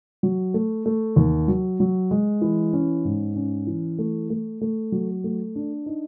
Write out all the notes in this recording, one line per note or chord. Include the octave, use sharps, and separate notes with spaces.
F#3
A3
A3
D#2
F#3
F#3
G#3
E3
C#4
G#2
C#4
E3
A3
A3
A3
F#3
A3
D4
D#4